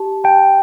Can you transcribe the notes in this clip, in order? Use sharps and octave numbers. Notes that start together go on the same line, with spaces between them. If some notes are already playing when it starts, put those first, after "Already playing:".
Already playing: G4 A5
G5 A5